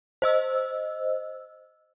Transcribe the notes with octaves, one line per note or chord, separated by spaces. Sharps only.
C5 D#5 E6